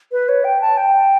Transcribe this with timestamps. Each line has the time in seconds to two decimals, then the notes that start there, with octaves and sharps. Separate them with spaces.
0.12 B4
0.29 C#5
0.44 G5
0.61 A5
0.77 G5